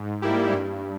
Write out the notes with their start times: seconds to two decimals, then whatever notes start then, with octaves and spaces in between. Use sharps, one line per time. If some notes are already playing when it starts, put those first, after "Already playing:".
Already playing: G#2
0.22 G3 A#3 E4 G4
0.53 G2